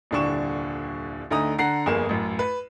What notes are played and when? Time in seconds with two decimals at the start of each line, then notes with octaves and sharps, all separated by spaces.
0.11 D#1 C2 D3 D4 C#6 E7
1.31 D2 D3 A3 D#4 A#5 D#6
1.58 D3 F#5 A#5 C7
1.86 G1 F2 A#3 G#4 E7
2.09 A1 F#2
2.39 B4